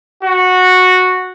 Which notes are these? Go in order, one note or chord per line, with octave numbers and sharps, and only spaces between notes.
F#4